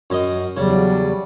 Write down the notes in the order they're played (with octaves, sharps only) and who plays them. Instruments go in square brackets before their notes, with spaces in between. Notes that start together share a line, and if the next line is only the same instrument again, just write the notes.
[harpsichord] F#2 D#5 D#6
[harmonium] E2 G3 [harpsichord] C#3 [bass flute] F#3